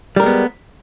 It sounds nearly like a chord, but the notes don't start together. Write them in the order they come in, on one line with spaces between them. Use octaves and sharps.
G3 A#4 G#3 B3